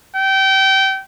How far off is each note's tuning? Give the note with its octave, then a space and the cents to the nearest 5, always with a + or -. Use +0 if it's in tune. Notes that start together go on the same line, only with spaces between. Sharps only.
G5 -25